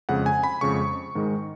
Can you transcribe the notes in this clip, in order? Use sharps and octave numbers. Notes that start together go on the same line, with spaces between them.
F2 C#3 G#3 F#5
G#5
B5
F2 C#3 G#3 C#6
G#2 D#3 G#3